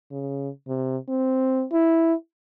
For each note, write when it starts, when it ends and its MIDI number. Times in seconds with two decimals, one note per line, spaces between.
0.11 0.49 49
0.68 0.97 48
1.08 1.64 60
1.73 2.13 64